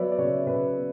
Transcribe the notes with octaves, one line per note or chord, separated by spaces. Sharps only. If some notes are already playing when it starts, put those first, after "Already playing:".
Already playing: F#3 B3 B4 C#5 D5 E5
D5
C#3 C#5
C#3 B4
B3